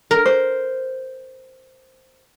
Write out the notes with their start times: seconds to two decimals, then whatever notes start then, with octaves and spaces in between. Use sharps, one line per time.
0.11 A#4
0.26 C5